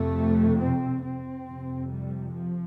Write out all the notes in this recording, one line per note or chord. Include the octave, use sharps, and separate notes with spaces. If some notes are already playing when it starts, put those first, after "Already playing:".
Already playing: F2 C3 A3
C4
C4
F2 C3
G3
F3